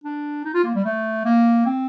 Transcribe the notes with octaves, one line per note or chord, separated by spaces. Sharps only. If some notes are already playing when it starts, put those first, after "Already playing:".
D4
D#4
F4
A#3
G3
A3
A#3
C4